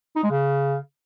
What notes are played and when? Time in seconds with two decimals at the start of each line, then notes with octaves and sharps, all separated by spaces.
0.16 D#4
0.23 G#3
0.31 C#3